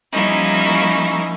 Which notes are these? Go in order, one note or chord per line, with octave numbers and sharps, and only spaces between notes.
F3 G3 A#3 C#4 D#4 E4